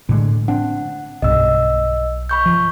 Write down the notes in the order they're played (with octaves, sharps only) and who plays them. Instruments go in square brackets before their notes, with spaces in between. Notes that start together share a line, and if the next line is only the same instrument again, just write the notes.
[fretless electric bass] A2 D3 G#3
[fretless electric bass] C4 D4 [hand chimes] F#5
[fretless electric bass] B1 G2 [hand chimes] D#5 E6
[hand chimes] B5 C#6 G6
[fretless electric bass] F3